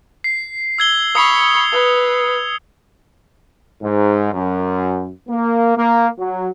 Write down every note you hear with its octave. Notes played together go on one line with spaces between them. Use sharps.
C7
E6 G#6 G7
B5 C#6 D#6 C#7 F7
B4
G#2
F#2
A#3
A#3
F#3